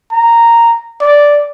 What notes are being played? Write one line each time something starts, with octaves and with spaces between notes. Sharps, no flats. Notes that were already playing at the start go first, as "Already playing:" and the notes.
A#5
D5